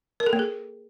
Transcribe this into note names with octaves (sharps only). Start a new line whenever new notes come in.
A#4
A4
A#3
G#4